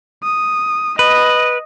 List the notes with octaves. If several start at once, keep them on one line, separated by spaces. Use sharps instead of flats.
D#6
B4 D#5